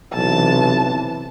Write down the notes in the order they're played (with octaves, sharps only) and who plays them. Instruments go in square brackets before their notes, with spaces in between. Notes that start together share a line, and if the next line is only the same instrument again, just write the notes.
[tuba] B1 [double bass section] C3 E3 [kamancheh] A5